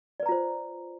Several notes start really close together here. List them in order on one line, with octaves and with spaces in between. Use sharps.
D5 B4 A#5 F4 C5